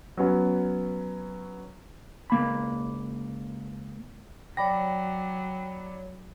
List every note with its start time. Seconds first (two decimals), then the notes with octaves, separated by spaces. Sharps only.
0.17 F#3 B3 C#4
2.30 C#2 A#3 B5
4.57 F#3 C#5 D5 G5 B5 D6 A#6